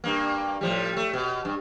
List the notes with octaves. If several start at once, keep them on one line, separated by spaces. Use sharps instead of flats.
G2 A#3
A2 F3 G3
A3
B2
G2